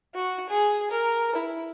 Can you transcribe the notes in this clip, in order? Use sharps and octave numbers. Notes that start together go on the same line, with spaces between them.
F#4
G#4
A#4
E4